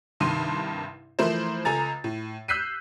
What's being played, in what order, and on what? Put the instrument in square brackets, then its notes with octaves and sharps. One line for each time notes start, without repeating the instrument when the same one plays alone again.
[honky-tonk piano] C2 G2 D#3 C6 D#7
E3 F3 A3 E4 A#4 C5
C#2 A4 G#5 A#5 A6
A2
E6 F#6 G6 B6 C7 D#7